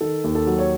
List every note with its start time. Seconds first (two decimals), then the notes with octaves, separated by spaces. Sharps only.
0.01 D#3 A4
0.24 D#2
0.35 A4
0.47 F#3
0.58 C#5